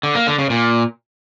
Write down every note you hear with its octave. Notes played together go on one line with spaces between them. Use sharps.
D3
A#3
D3
C#3
A#2